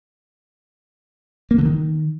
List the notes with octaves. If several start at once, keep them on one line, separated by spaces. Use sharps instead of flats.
A#3
D3
D#3